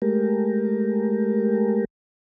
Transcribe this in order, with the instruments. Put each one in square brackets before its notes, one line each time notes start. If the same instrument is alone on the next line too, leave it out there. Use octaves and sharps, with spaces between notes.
[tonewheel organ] G#3 A3 G4 A#4